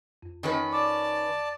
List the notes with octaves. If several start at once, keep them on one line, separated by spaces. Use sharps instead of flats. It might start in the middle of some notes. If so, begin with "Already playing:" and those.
F2
D#3 C#4 B4
D5 A5 D6